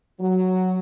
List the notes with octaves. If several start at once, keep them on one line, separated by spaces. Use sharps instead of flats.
F#3